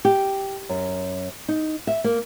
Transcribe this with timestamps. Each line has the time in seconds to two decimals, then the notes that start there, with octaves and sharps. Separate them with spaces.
0.05 G4
0.69 F#2
1.48 D#4
1.87 E5
2.04 A#3